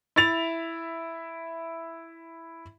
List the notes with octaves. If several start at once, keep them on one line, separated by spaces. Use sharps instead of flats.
E4 E5 A6 F7